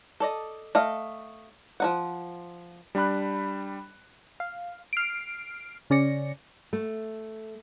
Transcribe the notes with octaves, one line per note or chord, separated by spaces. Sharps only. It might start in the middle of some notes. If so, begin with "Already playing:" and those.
A4 D5 D#5
A3 D#5 F5
F3 D#4 F#5
G3 D4 G5 B5 F#6
F5
F6 C7 D7
C#3 C#4 D5 A#6 C#7
A3